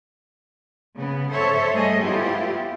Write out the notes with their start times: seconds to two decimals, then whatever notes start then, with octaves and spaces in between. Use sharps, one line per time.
0.96 C#3 B3
1.31 A4 C5 C#5 E5
1.72 G3 A3 G#4 D#5
2.02 B3 E4 F4 G4